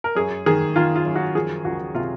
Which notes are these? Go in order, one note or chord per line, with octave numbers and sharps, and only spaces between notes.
A#4
F#2 G#4
D#3 G#4
D#3 F4
F4
F#2
F#4
F3 G#4
C#2 F#4
C3 F4